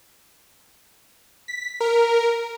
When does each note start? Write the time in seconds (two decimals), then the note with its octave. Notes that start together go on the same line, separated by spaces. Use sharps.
1.48 B6
1.80 A#4